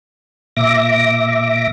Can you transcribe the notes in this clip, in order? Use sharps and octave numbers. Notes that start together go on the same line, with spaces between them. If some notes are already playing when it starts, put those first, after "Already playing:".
A#2 E5 D6 A#6